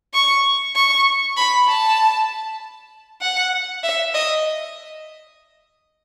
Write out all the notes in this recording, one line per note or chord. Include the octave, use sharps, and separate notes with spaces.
C#6
C#6
B5
A5
F#5
E5
D#5